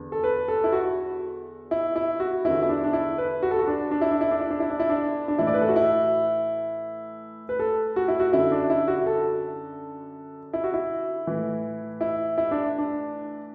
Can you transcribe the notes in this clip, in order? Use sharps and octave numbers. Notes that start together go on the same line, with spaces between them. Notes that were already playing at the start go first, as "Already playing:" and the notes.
Already playing: E2 D3
A4
B4
A4
E4
F#4
E4
E4
F#4
E2 D3 E4
E4
D4
D4
E4
B4
F#4
A4
F#4
D4
D4
E4
D4
E4
D4
E4
D4
E4
D4
E4
D4
D4
A2 E3 E4
D5
B4
A4
F#4
E4
B4
A4
F#4
E4
F#4
F#2 D3 E4
D4
E4
F#4
A4
E4
F#4
E4
A2 E3
E4
E4
D4
D4